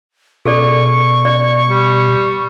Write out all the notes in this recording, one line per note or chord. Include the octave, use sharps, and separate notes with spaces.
B2 G#4 A4 D5 C#6
D5
G3